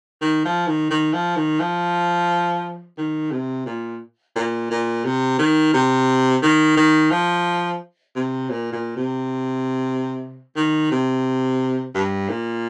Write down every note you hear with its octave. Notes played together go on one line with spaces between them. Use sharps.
D#3
F3
D#3
D#3
F3
D#3
F3
D#3
C3
A#2
A#2
A#2
C3
D#3
C3
D#3
D#3
F3
C3
A#2
A#2
C3
D#3
C3
G2
A#2